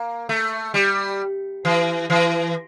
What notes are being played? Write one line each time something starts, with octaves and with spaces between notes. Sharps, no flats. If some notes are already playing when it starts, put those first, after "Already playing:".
Already playing: A#3
A3
G3
E3
E3